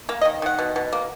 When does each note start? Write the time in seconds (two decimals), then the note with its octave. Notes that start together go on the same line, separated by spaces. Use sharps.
0.09 A#3 F5
0.21 D#5
0.25 D#3
0.42 D#3 F#5
0.59 B2
0.76 B2
0.93 A#3